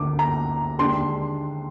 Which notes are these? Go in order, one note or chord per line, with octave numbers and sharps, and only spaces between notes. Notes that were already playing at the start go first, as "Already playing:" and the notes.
Already playing: D2 D3 A#3 D6
A#5
D#2 D3 G#3 D4 C6